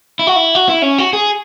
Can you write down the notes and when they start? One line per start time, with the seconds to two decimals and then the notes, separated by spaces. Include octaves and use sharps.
0.19 E4
0.27 F#4
0.36 E4
0.55 F#4
0.69 E4
0.82 C#4
0.98 F#4
1.13 G#4